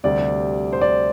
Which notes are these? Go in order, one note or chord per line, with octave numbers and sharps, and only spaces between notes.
D2 C3 G3 D5
C5
D5